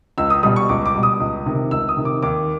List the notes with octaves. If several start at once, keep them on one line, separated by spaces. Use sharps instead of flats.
C#2 E6
D#6
B2 G3 D#6
C#6
C#2 D6
D6
B2 G3
D#6
C#2
C3 D#3
C#2 E6
D#6
C3 D#3
D6
D#2 D6